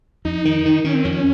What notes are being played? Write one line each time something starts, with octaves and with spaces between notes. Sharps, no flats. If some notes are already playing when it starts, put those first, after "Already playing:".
F2 D#4
D#3
D#3
D#3 C#4
C4
F2 C#4